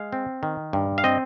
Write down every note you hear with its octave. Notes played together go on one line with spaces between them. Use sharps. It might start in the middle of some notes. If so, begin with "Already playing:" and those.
Already playing: G#3 F5
C4
D#3
G2
F5
C4 D#5